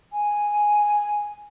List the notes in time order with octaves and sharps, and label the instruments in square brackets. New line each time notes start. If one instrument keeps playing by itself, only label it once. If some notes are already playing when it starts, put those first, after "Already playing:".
[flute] G#5